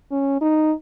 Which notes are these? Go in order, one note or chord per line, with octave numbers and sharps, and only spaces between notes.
C#4
D#4